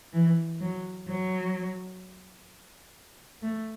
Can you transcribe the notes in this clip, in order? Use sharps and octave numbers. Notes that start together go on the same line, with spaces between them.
E3
F#3
F#3
A3